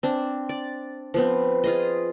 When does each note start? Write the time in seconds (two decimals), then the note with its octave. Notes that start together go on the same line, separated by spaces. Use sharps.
0.03 C4 D4
0.49 D5
1.14 F3 B3 C4
1.64 F4 G#4 D#5